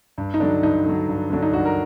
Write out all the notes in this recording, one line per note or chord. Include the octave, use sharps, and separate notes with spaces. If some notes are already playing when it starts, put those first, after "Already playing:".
G2
D#4
D3 F#3 D4
G2 D#4
D3 F#3
G2
D3 F#3 D4
D#4
G2 F#4
A#4